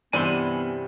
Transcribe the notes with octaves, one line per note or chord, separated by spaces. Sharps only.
G2 C3 E3 B3 D4 G#5 B5 C6